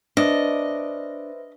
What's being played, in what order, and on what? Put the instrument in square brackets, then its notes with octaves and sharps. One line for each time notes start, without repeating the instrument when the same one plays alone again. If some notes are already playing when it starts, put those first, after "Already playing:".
[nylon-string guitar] D4 [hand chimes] B4 C5 E5 [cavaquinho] D#5